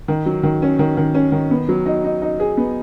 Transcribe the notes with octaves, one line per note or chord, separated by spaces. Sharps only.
D#3
F#3
D#3
C#4
D#3
D#3
C#4
D#3
B3
F#3
D#4
D#4
D#4
G#4
B3